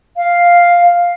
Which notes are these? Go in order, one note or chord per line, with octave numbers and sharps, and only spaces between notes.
F5